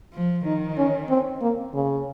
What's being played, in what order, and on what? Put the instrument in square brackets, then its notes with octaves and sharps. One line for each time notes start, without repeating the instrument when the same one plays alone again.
[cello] F3
[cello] D#3 [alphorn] D#4
[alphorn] C#4
C4
A#3
C#3